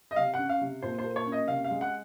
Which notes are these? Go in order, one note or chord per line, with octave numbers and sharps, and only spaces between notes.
D#5
C3 F5
C#4 F#5
F5
C3
A#2 C5
C5
A#3
C#5
C#4
D#5
C3 F5
F5
G#3
F#5